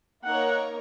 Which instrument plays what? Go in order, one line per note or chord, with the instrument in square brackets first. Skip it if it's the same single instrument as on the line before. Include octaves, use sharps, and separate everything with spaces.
[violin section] A#3 D#4 A#4 C#5 [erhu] F#5